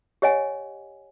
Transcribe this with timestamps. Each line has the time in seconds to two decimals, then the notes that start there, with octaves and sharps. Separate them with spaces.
0.22 G4 C#5 D#5 F#5 G#5